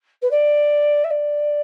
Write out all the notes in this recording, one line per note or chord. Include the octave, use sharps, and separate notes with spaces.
B4
D5
E5
D5